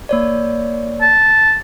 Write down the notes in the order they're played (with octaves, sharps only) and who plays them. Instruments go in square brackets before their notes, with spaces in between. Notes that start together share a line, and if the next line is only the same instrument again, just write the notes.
[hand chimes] A#3 C#5 D5
[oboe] A5